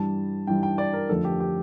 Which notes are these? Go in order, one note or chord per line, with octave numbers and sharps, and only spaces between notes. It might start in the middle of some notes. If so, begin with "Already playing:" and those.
Already playing: G2 E3 G3 A5
G2 E3 G3 G5
G5
D5
A#4
F2 D3 F3 A3 A4
G4
G4